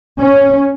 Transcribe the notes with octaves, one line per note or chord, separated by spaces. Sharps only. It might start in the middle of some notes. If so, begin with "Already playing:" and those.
C#4